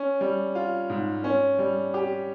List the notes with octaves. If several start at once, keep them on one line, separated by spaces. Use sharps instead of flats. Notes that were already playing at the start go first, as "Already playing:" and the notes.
Already playing: C#4
G3
F4
G#2
C#4
G3
G4